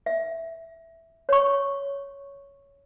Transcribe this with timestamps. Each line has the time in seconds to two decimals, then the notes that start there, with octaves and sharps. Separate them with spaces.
0.06 E5
1.29 C#5 C#6